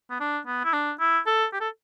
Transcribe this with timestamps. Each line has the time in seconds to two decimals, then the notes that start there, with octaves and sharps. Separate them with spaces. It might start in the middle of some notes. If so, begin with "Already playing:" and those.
0.10 B3
0.20 D4
0.47 B3
0.65 E4
0.73 D4
1.00 E4
1.27 A4
1.53 G4
1.61 A4